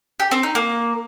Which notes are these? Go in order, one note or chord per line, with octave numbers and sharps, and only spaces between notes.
G4
C4
D#4
A#3